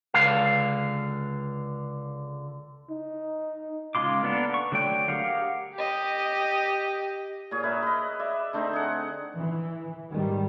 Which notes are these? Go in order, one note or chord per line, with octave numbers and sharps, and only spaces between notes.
C#2 D3 F5
D#4
C#3 G#3 F4 C6 D6
A#3 B3 D4 A4 A#4
C#6
D3 F#3 A3 D4 G5
G4 G#4 A#4 F5 F#5
G4 D#5
A#2 G#4 C#5
A#4 B4 E5
B4 D#5
D5 E5
D3 A3 C4 D#4
G#4 F#5
E3
G#2 D#3 G3